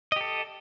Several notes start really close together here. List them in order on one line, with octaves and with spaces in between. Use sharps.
D#5 G4 A4